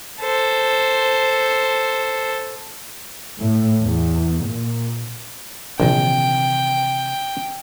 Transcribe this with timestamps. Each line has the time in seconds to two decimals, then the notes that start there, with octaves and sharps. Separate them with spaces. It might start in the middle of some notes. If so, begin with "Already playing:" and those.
0.21 A4 C5
3.39 A2
3.81 E2
4.44 A#2
5.80 A#1 C3 D#3 E3 G5